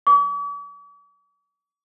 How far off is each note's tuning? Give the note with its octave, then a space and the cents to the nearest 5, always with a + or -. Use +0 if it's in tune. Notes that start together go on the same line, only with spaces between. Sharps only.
D6 -45